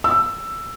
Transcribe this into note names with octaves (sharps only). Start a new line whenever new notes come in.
E6